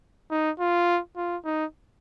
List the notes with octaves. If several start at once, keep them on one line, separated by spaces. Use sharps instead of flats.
D#4
F4
F4
D#4